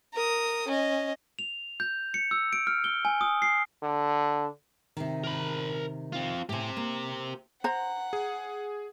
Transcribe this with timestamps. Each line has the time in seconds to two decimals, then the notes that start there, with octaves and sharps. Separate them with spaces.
0.13 A#4 D#6
0.68 C#4 D#5
1.39 F7
1.80 G6
2.14 C#7
2.31 E6
2.53 D7
2.67 F6
2.84 G7
3.05 G#5
3.21 D#6
3.42 C7
3.82 D3
4.97 C3 D#3
5.24 A#4 B5
6.12 C4 F4
6.49 A2 G4 C5 G#5
6.77 A#3
7.64 C5 F#5 A#5
8.13 G#4